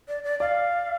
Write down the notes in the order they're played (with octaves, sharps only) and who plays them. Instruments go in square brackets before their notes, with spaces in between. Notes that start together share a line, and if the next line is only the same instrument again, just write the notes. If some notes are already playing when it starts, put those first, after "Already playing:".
[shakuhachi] D5
D5
[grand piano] D5 [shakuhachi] F5